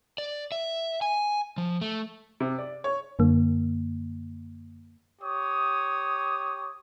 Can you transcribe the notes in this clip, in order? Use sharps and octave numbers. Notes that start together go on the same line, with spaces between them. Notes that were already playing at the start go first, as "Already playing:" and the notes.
D5
E5
G#5
F3
A3
C3
D5
C#5
F#2 D3 A#3
G4 C#5 D#6